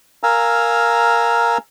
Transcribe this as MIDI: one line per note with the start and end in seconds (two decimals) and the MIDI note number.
0.23 1.58 70
0.23 1.58 77
0.23 1.58 80
0.23 1.58 82
0.23 1.58 88